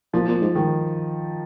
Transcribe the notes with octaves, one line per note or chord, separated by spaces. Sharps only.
A#2 F3
A#2
G#2
G#2 D#3